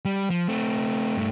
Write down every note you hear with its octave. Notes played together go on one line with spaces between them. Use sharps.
G3
F3
A3 C4
G2 A3